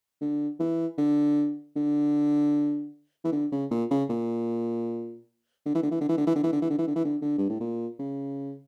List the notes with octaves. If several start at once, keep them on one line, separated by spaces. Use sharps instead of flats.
D3
E3
D3
D3
E3
D3
C#3
A#2
C#3
A#2
D3
E3
D3
E3
D3
E3
D3
E3
D3
E3
D3
E3
D3
E3
D3
E3
D3
D3
G2
A2
A#2
C#3